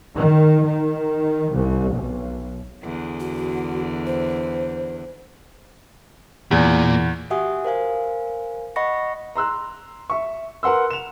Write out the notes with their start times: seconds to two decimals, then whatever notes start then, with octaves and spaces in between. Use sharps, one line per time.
0.17 D#3
0.65 D#3
1.53 C2
1.93 B1
2.82 E2 D3
3.20 F#4
4.06 C5
6.51 E2 A#2
7.30 F#4 G4 E5 F#5 G#5 D#6
7.65 A#4 C5 F5 G#5
8.76 D#5 F#5 B5 C#6 A#6 C#7
9.36 A#5 C6 E6 F#6
10.10 E5 C#6
10.63 A#4 B4 F#5 C6 E6
10.90 E7 F7